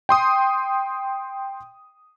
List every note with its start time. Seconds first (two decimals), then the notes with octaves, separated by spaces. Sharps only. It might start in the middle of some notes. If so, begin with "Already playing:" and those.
0.09 G5 C6 D#6